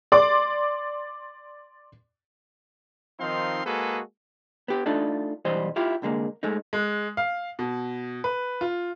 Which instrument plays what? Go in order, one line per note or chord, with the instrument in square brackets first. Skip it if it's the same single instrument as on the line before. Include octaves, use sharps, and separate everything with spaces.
[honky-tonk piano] D5 C6 D6
[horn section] D#3 F3 C4 D#4 F5 C6
G#3 A#3 F#4 G#4 A4 B4
[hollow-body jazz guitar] B3 G4
A3 D4 D#4 F4 A4
B1 E3 G3 C5 D#5
E4 F4 G4
C2 D3 G#3 A#3
G#3 A3 D#4
[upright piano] G#3
F5
B2
B4
F4